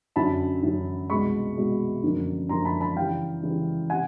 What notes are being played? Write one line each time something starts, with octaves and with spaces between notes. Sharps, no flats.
F#2 D3 F#3 A5 B5
F#2 D3 F#3
C2 B2 G#3 B5 C#6
C2 B2 G#3
F#2 D3 F3 A#3 D4
F#2 D3 F3 A#3 D4 A#5 C6
A5 B5
A5 B5
C#3 E3 G3 F5 G5
C#3 E3 G3
C3 F#5 G#5